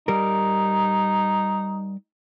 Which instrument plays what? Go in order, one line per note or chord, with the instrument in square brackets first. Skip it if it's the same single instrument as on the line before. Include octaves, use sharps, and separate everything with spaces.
[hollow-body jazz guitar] G3 A#4 [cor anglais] D#4